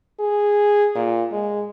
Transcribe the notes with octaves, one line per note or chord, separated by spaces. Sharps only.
G#4
A#2
G#3